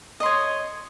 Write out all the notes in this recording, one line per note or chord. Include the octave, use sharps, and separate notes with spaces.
C#5 D#5 C6